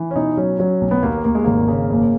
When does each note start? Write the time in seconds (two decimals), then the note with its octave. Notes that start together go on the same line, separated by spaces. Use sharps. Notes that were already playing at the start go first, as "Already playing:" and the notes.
Already playing: E3
0.11 C#4
0.16 B2 D#4
0.37 F#3 C#4
0.59 F#3 C#4
0.81 B1
0.91 B3
1.03 D#2 A#3
1.24 D#2 A#3
1.35 G#3
1.44 G#1 A#3
1.68 C#3
1.90 F#1